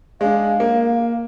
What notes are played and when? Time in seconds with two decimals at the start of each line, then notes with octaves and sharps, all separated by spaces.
0.21 G#3 D4 F5
0.60 A#3